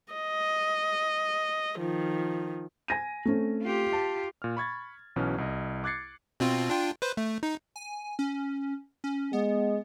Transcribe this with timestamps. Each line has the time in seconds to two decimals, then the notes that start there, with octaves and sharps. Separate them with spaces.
0.13 D#5
1.78 D#3 F3
2.88 G#5 A#6 D#7
3.25 A3 C4 C#4
3.62 F4 G4
3.92 A5
4.42 A#2 F6
4.57 B5 C#6 G#6 A6
5.16 B1 B2 E3 C#4 B4 F6
5.38 C2 D#5
5.84 D6 F#6 G#6 A6 C7 C#7
6.40 B2 C4 F4
6.70 D4 F4 G5
7.02 B4 C5
7.17 A3
7.43 D#4
7.76 G#5
8.19 C#4
9.04 C#4
9.33 G#3 B3